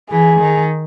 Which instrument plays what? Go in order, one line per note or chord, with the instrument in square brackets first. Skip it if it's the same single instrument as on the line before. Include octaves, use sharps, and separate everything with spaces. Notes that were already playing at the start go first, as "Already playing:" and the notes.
[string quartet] E3 [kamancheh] G#4
[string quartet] D#3